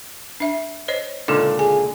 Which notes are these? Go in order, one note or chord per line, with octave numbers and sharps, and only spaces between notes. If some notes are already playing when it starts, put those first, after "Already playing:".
D4 E5
C5 C#5 D#5
C#2 A#2 D3 D#4 A4
G#4 G#5